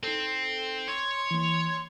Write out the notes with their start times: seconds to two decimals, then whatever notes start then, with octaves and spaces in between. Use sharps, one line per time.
0.03 C4 D#4 A4
0.88 C#5 C6
1.31 E3 A#3